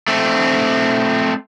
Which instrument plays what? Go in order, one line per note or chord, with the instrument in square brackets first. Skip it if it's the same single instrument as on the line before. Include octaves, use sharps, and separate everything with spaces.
[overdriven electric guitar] A3 C4